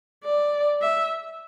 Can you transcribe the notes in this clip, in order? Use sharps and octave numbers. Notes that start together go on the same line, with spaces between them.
D5
E5